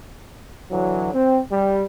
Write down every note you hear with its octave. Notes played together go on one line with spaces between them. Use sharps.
D3 E3 F#3
C4
G3